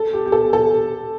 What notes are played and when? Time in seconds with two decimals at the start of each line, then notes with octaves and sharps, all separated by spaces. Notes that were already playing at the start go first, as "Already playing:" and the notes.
Already playing: A4
0.13 G4
0.26 G4
0.32 A4
0.53 A4